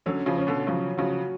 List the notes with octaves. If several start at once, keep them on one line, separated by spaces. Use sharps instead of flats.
D3 F#3 C#4
C#3 F3
C#4
B2 D3
C#3 F3 F#3
C#3 F3 F#4